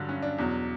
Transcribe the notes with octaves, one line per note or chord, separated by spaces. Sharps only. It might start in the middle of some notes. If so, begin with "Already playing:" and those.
Already playing: G2 D3 F#3
C#4
D4
E2 B2 F#3